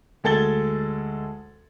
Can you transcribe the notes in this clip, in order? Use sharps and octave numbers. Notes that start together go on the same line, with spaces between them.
D2 G#3 A4 G#6 A6 G7